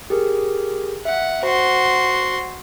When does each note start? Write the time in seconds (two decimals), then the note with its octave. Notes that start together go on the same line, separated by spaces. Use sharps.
0.10 G4 G#4 A#4
1.05 E5 F#5
1.43 F#4 C5 F#5 C6